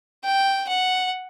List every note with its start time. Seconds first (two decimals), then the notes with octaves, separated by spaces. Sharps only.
0.24 G5
0.68 F#5